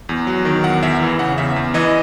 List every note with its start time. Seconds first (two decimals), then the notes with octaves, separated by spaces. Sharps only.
0.09 E2
0.27 F#3
0.45 D#3
0.64 E2 F#5
0.82 E2 E5
1.01 E3
1.19 C#3 F#5
1.38 E2 E5
1.56 E2
1.74 E3 D#5